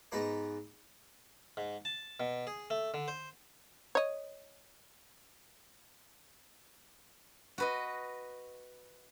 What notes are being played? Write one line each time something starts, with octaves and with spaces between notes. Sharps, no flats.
G#2 B3 D#4 B4 D6
G#2
A5
B2
G#4
A3
D3
C5
C#5 D#5
F#4 B4 D#5